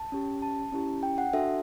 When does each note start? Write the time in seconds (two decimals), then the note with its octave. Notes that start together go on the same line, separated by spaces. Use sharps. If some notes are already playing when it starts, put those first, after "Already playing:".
Already playing: A5
0.12 C#4 G4
0.42 A5
0.72 C#4 E4 G4
1.03 G5
1.18 F#5
1.33 D4 F#4 A4 E5